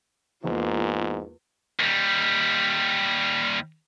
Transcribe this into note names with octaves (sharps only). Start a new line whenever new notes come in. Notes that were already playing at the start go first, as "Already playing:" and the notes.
E2 G#2 A#3 F4
D#2 G3